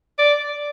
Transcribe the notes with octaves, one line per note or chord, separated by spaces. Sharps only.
D5